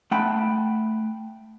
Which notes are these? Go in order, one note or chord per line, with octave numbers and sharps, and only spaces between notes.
A3 F#5 G5 A5 B5